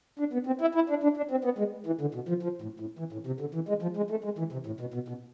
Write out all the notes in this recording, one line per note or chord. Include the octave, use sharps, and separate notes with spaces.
D4
B3
C4
E4
E4
D4
D4
D4
C4
B3
G#3
E3
D3
B2
F3
F3
A2
A2
E3
A2
C3
D3
E3
G#3
F3
G#3
A3
G#3
E3
C3
A2
B2
B2
B2